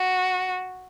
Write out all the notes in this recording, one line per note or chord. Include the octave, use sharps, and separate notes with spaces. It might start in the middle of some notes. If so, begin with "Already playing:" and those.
Already playing: F#4